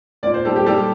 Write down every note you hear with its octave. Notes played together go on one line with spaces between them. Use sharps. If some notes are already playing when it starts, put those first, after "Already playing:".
A#2 D5
C5
G3 A4
G4
G3 A4